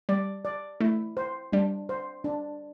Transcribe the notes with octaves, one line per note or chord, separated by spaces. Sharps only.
G3 D5
D5
A3 E4
C5
G3 D4
C5
D4